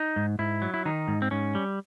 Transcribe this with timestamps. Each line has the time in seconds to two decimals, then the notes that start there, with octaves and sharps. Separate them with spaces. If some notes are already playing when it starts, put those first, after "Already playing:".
Already playing: D#4
0.16 G#2
0.39 G#2 E4
0.62 F#3
0.74 E4
0.85 D#3 D#4
1.08 G#2
1.22 C4
1.31 G#2 C#4
1.55 G3